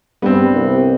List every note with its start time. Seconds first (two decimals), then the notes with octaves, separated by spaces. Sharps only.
0.22 G2 B3 C4
0.55 C2